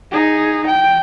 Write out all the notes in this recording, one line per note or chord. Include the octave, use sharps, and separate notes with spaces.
D#4 G#4
G5